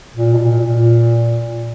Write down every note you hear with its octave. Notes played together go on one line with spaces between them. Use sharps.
A#2
B2
A#2
A#2